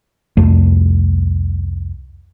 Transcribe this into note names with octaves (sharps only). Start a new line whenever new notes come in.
C2 F2 A3